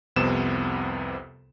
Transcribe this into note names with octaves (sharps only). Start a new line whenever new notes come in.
C2 F2 C3 B3 E7